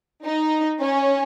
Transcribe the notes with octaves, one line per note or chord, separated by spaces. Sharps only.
D#4
C#4